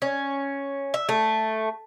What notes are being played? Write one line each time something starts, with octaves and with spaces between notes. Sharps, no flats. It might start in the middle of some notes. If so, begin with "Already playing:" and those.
C#4
E5
A3